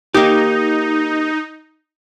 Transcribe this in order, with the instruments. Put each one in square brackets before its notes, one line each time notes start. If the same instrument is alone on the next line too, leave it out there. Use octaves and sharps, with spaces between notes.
[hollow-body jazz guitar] A#3 G4 [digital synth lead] D#4